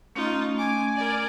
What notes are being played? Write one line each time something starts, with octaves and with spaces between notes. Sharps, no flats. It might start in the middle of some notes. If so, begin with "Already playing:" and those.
A3 C#4 D#4 F4
G#5 D6
A#4 D5